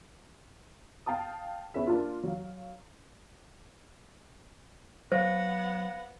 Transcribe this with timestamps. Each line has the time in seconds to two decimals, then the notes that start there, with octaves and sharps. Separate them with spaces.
1.06 F5 G5 A5 D#6
1.74 B3 C#4 G#4 E5
1.87 A#3 D4 F4
2.23 F#3 F5
5.12 F#3 B3 C5 F5 F#5 A#6